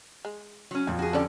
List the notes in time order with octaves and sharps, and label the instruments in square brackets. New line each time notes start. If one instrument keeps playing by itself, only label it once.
[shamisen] G#3
[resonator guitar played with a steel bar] F#3 C#4
[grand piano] F2 F3 [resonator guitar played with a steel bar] A#2
[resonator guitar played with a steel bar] F#4 G#4
[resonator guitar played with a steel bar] D3 C#4 G4 [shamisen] A4 D5